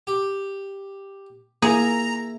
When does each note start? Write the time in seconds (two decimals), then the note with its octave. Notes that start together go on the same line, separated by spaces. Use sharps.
0.07 G4
1.62 A#3 E4 G#4 A#5